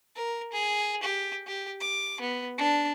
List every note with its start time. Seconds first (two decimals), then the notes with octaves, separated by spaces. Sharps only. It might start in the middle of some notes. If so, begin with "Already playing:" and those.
0.16 A#4
0.52 G#4
1.03 G4
1.47 G4
1.81 D6
2.21 B3
2.58 D4